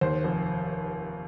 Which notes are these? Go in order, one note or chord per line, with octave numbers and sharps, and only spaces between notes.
D#2 C5
F1